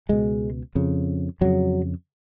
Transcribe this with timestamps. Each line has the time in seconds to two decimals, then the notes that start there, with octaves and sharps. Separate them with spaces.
0.09 C#2 B2 G#3
0.75 F2 C#3
1.41 F2 C#3 F#3